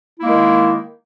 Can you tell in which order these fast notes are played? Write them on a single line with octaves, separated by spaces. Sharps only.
E4 A#3 G#3 D#3